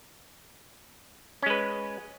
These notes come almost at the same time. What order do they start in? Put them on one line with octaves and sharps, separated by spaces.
C#4 G#3 B4